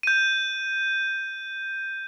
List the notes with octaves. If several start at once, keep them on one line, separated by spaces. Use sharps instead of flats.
G6 D#7